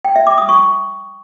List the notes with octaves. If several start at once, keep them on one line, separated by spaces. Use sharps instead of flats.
G5
E5
D6
D#6
C#6